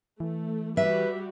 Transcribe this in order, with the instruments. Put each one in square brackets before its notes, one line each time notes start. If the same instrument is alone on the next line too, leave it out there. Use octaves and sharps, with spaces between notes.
[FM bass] E3 [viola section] A3
[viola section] G3 F#4 G4 [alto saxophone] B4 [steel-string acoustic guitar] E5